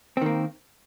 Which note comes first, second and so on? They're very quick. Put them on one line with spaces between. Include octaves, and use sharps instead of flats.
C4 D#3 A#3